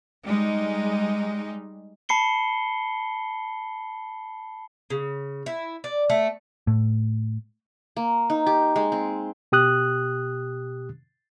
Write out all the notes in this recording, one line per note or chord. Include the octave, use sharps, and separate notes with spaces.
G3 G#3 D#4
A5 B5 C7 C#7 G7
C#3
E4
D5
A3
A2
A#3
D#4
G4
G#3
C4
B2 G4 D#6 F#6